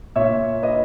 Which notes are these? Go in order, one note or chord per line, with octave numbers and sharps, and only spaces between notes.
A#2 A#3 C#5 E5
B4 D#5